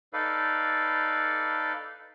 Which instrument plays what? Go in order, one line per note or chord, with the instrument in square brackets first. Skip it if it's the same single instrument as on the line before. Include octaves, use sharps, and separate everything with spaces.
[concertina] D#4 A4 B4 D5 F5